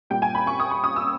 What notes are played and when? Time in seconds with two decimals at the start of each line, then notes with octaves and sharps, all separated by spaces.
0.10 A#2 G3 G5
0.22 G#5
0.35 B5
0.47 C#6
0.60 D#6
0.71 C#6
0.84 D#6
0.96 E6